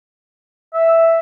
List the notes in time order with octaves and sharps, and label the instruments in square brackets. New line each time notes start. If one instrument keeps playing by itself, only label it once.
[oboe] E5